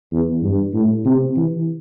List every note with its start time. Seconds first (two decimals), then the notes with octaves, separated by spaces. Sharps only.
0.12 E2
0.43 G2
0.73 A2
1.05 C3
1.37 E3